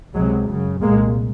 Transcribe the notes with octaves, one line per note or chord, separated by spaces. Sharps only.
C#2 C3 F#3 G#3
F#2 C#3
C2 A#2 G#3 A#3